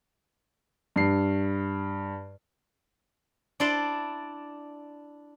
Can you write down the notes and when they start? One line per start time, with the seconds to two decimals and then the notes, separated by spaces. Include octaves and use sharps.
0.96 G2 C7
3.60 D4 E4 D5 C6